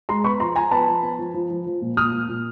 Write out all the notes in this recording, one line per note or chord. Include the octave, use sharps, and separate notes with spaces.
G#3 A#5 C6
B3 B5 C#6
F3 A#5 C6
F3 G#5 A#5
B3 A5 B5
F3
B3
F3
F3
F3
F3
A#2
A#2 D#6 F6
A#2
A#2